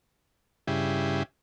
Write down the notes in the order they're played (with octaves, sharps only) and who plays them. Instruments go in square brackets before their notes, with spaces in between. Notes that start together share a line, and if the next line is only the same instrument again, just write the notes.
[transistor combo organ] G2 C#3 E4 G4 G#4